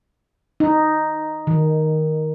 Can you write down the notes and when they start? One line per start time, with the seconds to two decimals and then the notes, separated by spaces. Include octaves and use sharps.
0.60 D#4
1.47 D#3